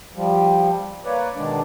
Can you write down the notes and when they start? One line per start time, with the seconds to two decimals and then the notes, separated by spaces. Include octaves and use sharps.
0.15 F3 G3
1.05 A#3 B4 C#5 D5
1.35 B2 D3 D#3 G#3 D4 D5